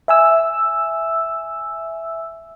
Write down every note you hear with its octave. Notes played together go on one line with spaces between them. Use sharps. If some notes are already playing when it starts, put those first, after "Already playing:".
E5 G#5 E6